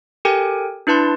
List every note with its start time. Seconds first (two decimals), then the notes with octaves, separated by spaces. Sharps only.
0.25 G4 A4 A#4 G5 G#5
0.87 D4 E4 B4 A5 C6